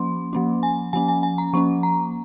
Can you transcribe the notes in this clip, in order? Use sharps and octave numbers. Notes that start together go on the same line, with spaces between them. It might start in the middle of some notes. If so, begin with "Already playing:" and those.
Already playing: F3 A#3 C#4 C6
F3 A#3 C#4
G#5
F3 A#3 C#4 G#5
G#5
G#5
A#5
F3 A#3 C#4 C#6
A#5